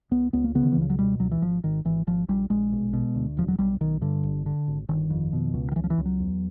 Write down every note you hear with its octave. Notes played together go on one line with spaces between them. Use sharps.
C#2 B3
C#2 B3
A#3
C#3 B3
D#3
E3
C#2
F3
F#3
B2 G3
C#2 F#3
E3
G#1 F3
G#1 D#3
G#1 E3
G#1 F3
A#1 G3
A#1 G#3
B1
B2
D2
E1 F3
F#3
B1 G3
B1 D#3
G2 D3
G1
D3
G#1
G1 D#3
F2
B2
C#2
D#3
C#2 E3
F3
E3
C#2
F#3
E2